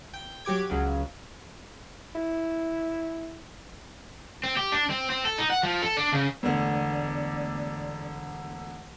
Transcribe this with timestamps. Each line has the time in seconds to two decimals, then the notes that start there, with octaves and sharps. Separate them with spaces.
0.14 G5
0.45 F#3 G4 D6 G#6
0.70 C#2 C#3 F#3
2.16 E4
4.44 C4
4.57 G4
4.72 D4
4.90 C4
5.10 C4
5.25 A4
5.38 D#4
5.50 F#5
5.63 F3
5.82 A4
5.97 D4
6.13 C#3
6.43 E1 D3 A3 B3 D5